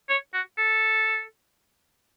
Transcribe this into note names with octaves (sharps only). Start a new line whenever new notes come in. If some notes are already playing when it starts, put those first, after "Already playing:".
C#5
F#4
A4